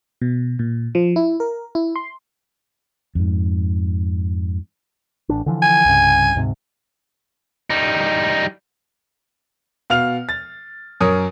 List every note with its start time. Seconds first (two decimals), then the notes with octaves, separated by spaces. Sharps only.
0.22 B2
0.59 A#2
0.95 F3
1.16 E4
1.40 A#4
1.75 E4
1.96 C6
3.15 F2 G#2
5.29 A1 D4
5.46 D3 E3 F3
5.63 G#5
5.85 C2 G2 C#3
6.35 D2 G#2 C3
7.70 G3 D#4
9.90 B2 F5 F6 F7
10.29 A6
11.01 F#2 A#4 C#5 D#6